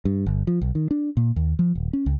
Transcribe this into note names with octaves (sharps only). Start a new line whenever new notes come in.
G2
G1
F3
B1
D#3
D4
A#2
D#2
F3
D#1
C#4
C#2